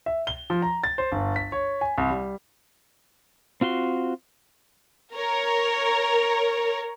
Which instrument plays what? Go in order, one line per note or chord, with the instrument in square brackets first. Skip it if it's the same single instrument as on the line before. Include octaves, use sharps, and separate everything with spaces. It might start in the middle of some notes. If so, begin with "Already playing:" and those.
[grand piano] E5
G7
F3
A#5
A6
C5
G1
B6
C#5
G#5
C2
G3
[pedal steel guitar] C4 F4 F#4 C6
[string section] A#4 C#5